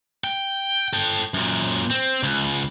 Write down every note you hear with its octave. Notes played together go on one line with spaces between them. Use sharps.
G5
A4 G5
F#2 A#2
C4
C#2